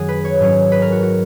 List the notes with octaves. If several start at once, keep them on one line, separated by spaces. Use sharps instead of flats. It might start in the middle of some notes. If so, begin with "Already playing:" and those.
Already playing: F#2 D#3 G#3 G#4 F#5
B4
C#5
G#2 F#3 C#4
B4
A#4
F#4
F#4